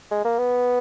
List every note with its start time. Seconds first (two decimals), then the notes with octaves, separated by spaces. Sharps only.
0.11 G#3
0.25 A#3
0.39 B3